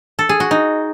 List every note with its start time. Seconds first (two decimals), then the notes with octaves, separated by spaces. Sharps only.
0.19 A4
0.29 G#4
0.40 F#4
0.51 D#4